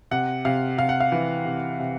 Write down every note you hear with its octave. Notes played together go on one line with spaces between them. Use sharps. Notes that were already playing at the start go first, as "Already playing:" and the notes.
C3 F#5
C3 F5
C3 F5
F#5
F5
E3
C3
C3